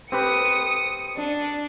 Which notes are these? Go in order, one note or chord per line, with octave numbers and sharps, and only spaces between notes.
C4 G4 B4 D#6 C#7
D4